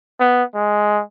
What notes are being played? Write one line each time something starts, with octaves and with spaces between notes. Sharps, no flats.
B3
G#3